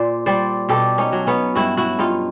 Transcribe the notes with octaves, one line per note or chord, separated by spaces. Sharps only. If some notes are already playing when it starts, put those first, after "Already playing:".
Already playing: A#2 C5 D5
G3 C5 D5
B2 G4 A4
C#4 D#4
F#3
B3 C#4
G2 E4 F#4
E4 F#4
G2 D#4 F4